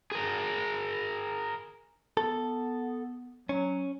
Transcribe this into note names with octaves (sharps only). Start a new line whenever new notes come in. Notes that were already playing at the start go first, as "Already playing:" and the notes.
G#4 A#4
B3 A4
F#3 C#4